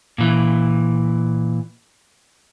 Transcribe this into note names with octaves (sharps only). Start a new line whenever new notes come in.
A#2 E3